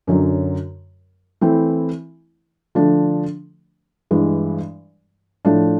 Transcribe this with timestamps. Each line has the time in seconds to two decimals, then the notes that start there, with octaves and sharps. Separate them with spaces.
0.07 F#2 D3 F#3
1.41 E3 A3 C4 E4
2.75 D3 F3 A3 D4
4.11 G2 E3 G#3
5.45 A2 F3 A3 D4